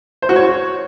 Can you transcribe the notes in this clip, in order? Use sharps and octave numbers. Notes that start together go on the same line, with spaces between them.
C5
F#4
C#5